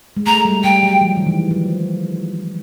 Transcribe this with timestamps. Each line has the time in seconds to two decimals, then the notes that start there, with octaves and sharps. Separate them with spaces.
0.17 G#3
0.26 A3 A#5
0.45 G3
0.64 G3 G5
0.83 F#3
1.01 F3
1.17 D#3
1.26 E3
1.51 F3